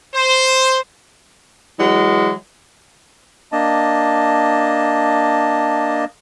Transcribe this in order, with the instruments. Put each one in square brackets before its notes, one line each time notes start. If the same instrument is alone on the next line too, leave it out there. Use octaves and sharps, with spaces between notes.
[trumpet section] C5
[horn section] E3 F#3 G#3
[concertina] A#3 D4 D#5 A5